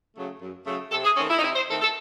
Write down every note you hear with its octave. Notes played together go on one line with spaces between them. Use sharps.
C#3 F#3 A3
F#2
C#3 F#3 A3
C3 A4
G#4
D#3 A3 C4 C#4
E4
D#4
C3 E4
C5
D#3 A3 C4 A4
A4